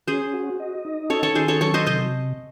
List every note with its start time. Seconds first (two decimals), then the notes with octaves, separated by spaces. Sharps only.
0.07 C#4 G#4 C5
0.34 F#4
0.60 D#5
0.85 D#4
1.10 C#4 A4 C#5
1.23 A4 C#5
1.35 D#3 G#4 C5
1.48 A4 C#5
1.61 F#3 A4 C#5
1.74 C5 D#5
1.86 C3 C5 D#5